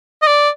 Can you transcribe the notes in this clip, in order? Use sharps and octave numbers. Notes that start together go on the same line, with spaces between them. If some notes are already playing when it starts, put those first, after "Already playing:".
D#5
D5